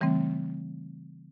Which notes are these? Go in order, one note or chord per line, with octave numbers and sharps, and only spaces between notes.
C#3 E3 G3 A3 C4